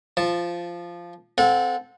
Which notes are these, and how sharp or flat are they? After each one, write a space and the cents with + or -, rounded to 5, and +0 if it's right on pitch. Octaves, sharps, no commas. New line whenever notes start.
F3 -10 A5 +0
C4 -15 A4 -10 F#5 -35